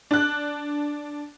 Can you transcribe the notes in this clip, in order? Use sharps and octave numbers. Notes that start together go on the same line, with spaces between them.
D4 F#6